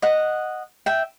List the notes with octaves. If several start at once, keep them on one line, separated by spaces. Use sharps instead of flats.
D#5 F#5
E5 G5